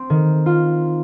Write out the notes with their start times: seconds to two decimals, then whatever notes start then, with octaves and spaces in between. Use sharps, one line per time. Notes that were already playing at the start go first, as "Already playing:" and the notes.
Already playing: C4
0.10 D#3
0.46 F4